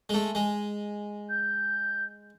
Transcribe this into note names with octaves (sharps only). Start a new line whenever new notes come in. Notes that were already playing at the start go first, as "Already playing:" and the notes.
G#3 A3
G#3
G6